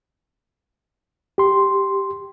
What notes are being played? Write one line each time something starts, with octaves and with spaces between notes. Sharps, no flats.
G4 C6